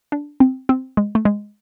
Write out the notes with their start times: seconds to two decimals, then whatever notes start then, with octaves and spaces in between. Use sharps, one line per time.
0.12 D4
0.40 C4
0.69 C4
0.97 G#3
1.15 A3
1.25 G#3